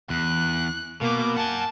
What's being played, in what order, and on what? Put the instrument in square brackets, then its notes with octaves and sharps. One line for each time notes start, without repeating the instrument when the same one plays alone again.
[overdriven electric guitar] E2 [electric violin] F#6
[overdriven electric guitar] B2 [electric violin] A#3 D6
[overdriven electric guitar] F#5 G#5 [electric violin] A5